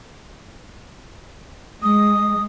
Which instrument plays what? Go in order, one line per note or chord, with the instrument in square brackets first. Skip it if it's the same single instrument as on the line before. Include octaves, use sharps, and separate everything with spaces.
[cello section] G#3 [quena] D#6